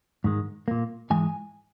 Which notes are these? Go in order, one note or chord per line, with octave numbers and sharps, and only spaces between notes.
G#2 D#3 G#3
A#2 A#3
G#2 E3 G#3 G#5